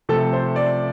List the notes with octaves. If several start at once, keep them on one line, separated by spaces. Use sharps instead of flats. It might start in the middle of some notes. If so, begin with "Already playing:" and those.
C3 F3 A3 A4
C5
D5